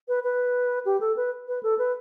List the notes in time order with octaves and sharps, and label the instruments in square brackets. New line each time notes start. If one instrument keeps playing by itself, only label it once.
[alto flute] B4
B4
G4
A4
B4
B4
A4
B4